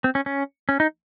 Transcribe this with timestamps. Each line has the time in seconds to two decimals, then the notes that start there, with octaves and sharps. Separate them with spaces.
0.04 C4
0.15 C#4
0.26 C#4
0.69 C#4
0.80 D#4